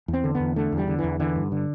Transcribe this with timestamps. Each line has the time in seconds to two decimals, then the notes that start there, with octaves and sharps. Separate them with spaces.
0.08 E2
0.13 C4
0.24 D3
0.35 B3
0.40 E2
0.56 D3 A3
0.72 E2
0.78 G3
0.88 D3
0.99 E3
1.04 E2
1.20 D3 E3
1.36 G2
1.52 D3